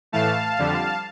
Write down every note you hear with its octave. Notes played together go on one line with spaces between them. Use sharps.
A2 E3 A3 F5 A5
F2 D3 G3